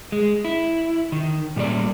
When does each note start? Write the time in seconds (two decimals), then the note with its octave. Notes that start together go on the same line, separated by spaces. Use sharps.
0.12 G#3
0.45 E4
1.12 D#3
1.56 A#2 G3 A3 B4 D5